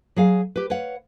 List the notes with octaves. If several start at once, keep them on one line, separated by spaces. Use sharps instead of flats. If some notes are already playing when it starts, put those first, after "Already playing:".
F#3 G#4 F5 G#5
G4 B4
B4 C#5 F5 F#5